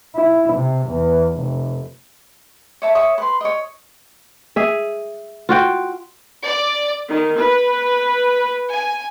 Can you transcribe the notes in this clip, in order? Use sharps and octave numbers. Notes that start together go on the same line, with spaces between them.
E4
C3
E2
F1
C#5 E5 A5
C#5 E5 C#6 D#6
B4 C6
C#5 D#5
G#4 E5
F4 F#4 G5
D5
D#3
B4
G#5